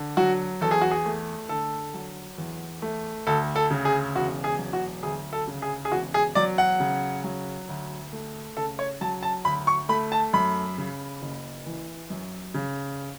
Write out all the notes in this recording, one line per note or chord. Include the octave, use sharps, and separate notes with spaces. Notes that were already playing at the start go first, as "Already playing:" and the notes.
Already playing: D3
F#3 F#4
E2 A4
G#4
F#4
G#4
A3
D3 A4
F#3
E2
A3
D2 A4
A4
C#3
G#4
E1 F#4
G#4
F#3
F#4
D2 G#4
A4
C#3
G#4
G#4
E1 F#4
G#4
F#3 D5
F#5
C#3
F#3
D2
A3
C#3 A4
C#5
F#3 A5
A5
D2 B5
C#6
A3 B5
A5
F#2 B5
C#3
F#1
E3
F#2
C#3